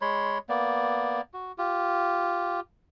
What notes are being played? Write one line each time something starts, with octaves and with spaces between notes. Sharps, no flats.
G#3 C#5 B5 C6
A#3 B3 D5
F#4
F4 G4